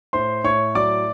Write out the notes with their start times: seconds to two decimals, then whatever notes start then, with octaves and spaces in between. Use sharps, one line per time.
0.13 A2 C5 C6
0.44 A2 C#5 C#6
0.75 F#3 D5 D6